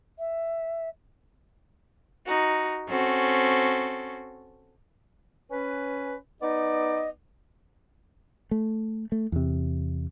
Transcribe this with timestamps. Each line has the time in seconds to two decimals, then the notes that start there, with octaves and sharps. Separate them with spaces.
0.18 E5
2.25 D#4 F#4
2.88 C4 C#4 F#4 A4
5.50 C#4 B4
6.41 B3 D#4 D5 D#5
8.51 A3
9.12 A3
9.32 E2 C3